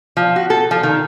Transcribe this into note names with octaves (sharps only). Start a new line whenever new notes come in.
F3
F#4
A4
F3
D#3